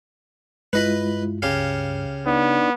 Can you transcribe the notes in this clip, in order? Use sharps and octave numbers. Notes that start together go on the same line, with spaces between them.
G2 G#3 E4 F4 B4 D#5 B5
C#2 C#3 G4 F5
B3 D4 D#4 D5